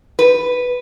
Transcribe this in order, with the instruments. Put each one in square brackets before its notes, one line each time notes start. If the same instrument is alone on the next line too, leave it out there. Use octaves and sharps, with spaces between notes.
[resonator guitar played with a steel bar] B4